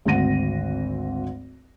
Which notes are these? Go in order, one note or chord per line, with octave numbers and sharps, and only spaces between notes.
G#1 D2 C4 F#5 A#6 D#7